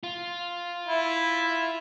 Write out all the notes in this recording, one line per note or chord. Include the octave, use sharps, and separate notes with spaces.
F4
E4